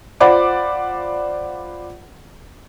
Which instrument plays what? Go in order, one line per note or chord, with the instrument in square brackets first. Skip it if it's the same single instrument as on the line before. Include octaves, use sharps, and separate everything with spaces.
[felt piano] F4 C5 D5 F#5 B5 D6